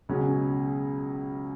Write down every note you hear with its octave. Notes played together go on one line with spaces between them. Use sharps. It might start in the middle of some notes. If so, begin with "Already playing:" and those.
C#2 B2 F#3 C#4 G#4